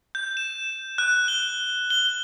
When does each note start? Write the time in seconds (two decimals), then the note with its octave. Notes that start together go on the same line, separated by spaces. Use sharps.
0.15 G6
0.37 E7
0.98 F#6
1.28 G7
1.90 G7